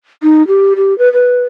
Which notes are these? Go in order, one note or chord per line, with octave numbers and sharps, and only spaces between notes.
D#4
G4
G4
B4
B4